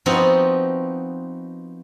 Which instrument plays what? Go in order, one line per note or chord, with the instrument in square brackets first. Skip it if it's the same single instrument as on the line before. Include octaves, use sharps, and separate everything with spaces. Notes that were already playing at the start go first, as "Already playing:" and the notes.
[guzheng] F3 B3 C4 D#4 F#4